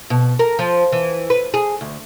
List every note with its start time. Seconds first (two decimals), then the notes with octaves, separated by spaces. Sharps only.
0.10 B2
0.39 A#4
0.59 F3
0.92 E3
1.30 B4
1.54 G#4
1.81 D2